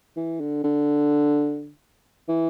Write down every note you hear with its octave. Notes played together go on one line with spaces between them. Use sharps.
E3
D3
D3
E3